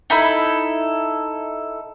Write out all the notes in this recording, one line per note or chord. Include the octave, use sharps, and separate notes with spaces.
D#4 E4 A4 B5